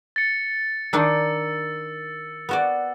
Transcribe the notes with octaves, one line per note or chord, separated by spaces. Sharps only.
A6 C#7
D#3 D4 D#4 E6
B3 F#4 D5